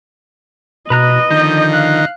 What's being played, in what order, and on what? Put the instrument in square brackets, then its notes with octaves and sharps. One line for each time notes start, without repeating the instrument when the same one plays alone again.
[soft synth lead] B2 [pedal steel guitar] B4 A#5 F#6 [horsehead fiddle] D#5
[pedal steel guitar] D3 F3 [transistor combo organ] D#3 [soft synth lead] G6
[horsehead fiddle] F5 [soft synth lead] F#6